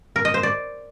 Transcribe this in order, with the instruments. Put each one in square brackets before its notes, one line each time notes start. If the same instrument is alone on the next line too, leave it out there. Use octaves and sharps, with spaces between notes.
[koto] A#4
D#5
C5
D5